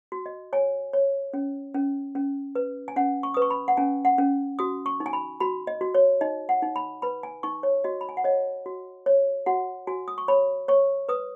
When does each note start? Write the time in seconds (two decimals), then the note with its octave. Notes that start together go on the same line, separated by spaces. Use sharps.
0.12 F#4
0.26 D#5
0.53 C#5 G#5
0.93 C#5
1.33 C#4
1.74 C#4
2.15 C#4
2.55 B4
2.88 G#5
2.96 C#4 F#5
3.23 C#6
3.34 B4 D#6
3.42 C#6
3.50 B5
3.68 F#5
3.77 C#4 G#5
4.05 F#5
4.18 C#4
4.59 F#4 D#6
4.86 C#6
5.00 D#4
5.06 G#5
5.13 B5
5.40 F#4 B5
5.67 D#5
5.81 F#4
5.95 C#5
6.21 D#4 D#5
6.49 F#5
6.62 D#4
6.76 B5
7.02 B4 B5
7.23 G#5
7.43 D#4 C#6
7.63 C#5
7.84 F#4 D#5
8.01 B5
8.09 G#5
8.17 F#5
8.24 C#5 D#5
8.66 F#4
9.06 C#5
9.46 F#4 F#5
9.87 F#4 G#5
10.08 D#6
10.18 C#6
10.28 C#5 B5
10.68 C#5 C#6
11.09 B4 D#6